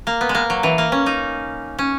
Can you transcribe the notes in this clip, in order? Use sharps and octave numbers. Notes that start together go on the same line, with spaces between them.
A#3
B3
G#3
A#3
F#3
E3
A#3
C#4
D#4
C#4